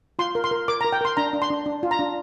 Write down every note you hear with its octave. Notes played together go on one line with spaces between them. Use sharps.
F4 C6
A#4
C6
A#4
A#4 D6
A#5
A#4
G5
A#4 C6
D4 A#5
D4
C6
D4
D4
F4
A#5
D4